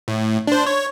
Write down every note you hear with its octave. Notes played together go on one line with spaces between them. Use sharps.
A2
D4 C5
C#5